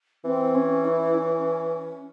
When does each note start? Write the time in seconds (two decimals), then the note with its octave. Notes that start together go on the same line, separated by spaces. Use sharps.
0.24 E3 C4
0.54 C#4
0.84 E4
1.14 C#4